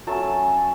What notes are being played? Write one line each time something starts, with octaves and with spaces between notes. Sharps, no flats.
F#3 A3 C#4 A5